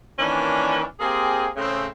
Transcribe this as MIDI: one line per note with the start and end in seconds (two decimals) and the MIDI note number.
0.19 0.84 51
0.19 0.84 52
0.19 0.84 58
0.19 0.84 61
0.19 0.84 62
1.00 1.48 58
1.00 1.48 60
1.00 1.48 67
1.00 1.48 68
1.56 1.86 45
1.56 1.86 49
1.56 1.86 60